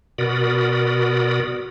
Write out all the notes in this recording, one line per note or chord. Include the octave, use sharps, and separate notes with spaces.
B2 F#4 A#4 D5 B5 D#6